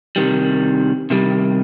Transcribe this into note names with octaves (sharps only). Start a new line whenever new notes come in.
C3 D#3 G3
C3 D#3 G3